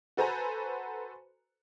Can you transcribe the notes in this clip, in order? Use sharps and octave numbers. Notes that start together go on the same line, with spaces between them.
F#4 A4 B4 C5 G#5 A#5